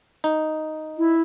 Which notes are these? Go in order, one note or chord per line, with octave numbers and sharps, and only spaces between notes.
D#4
E4